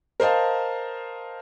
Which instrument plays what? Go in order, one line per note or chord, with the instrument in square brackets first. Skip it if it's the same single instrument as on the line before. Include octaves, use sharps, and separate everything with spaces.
[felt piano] A#4 C5 D#5 F5 A5